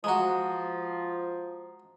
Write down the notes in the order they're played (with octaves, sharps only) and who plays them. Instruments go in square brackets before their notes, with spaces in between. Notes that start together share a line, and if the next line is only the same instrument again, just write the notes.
[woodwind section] F3 [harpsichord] G#3 F#4 [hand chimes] A#5 D#6